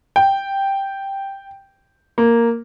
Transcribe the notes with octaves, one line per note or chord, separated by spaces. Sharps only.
G5
A#3